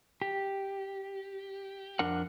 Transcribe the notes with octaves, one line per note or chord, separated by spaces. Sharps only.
G4
F2 D4 A#4 F#5